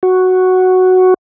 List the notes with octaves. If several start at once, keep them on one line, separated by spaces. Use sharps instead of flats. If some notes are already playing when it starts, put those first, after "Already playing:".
F#4